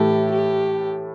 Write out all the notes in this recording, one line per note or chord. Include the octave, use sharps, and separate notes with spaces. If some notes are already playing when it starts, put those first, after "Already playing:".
Already playing: A2 E3 A3 G4
G4